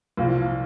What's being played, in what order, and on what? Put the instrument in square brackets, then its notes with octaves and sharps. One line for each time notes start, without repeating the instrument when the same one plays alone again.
[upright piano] C2 A#2 F3 F5